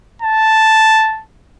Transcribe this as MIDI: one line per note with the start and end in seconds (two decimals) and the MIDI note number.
0.22 1.22 81